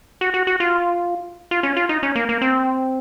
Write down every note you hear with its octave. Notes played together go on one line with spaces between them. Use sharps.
F#4
F#4
F#4
F4
F4
C#4
F4
D#4
C#4
A#3
A#3
C4